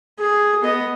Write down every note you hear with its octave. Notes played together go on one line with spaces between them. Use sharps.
G#4
B3 D#5